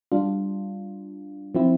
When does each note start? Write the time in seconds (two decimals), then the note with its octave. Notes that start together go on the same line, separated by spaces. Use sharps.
0.12 G3 D4 F4
1.55 F3 C4 E4